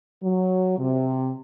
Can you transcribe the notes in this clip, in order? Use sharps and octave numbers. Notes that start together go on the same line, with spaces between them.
F#3
C3